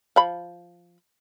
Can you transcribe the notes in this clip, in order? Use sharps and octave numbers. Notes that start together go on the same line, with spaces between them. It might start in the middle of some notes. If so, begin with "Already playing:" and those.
F3 B5